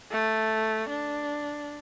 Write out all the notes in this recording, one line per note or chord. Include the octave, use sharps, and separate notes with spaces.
A3
D4